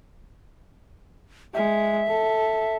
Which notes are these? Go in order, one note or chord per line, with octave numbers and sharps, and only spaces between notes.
G#3 E5
A4